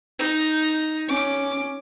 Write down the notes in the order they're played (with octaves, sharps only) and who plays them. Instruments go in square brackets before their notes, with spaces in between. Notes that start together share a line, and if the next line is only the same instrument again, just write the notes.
[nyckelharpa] D#4
[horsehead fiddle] C#4 [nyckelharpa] D6